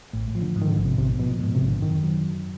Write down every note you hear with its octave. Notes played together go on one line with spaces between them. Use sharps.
A1 A2
A2
F3
D3
G#2
D#3
D3
A1
C3
A1 C3
B2
B2 F3
A#2
G#2 B2
C3
A1
D3
F#2 D#3
F#3